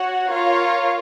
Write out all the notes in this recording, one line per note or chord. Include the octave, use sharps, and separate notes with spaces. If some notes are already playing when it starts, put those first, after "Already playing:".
Already playing: F#4 C#5 F#5
F4 A#4 C#5 F5